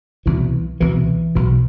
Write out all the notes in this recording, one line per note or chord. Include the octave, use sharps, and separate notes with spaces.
C2 B2 E3
C2 B2 E3
B1 B2